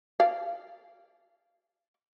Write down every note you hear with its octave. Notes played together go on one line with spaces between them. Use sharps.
D5 F5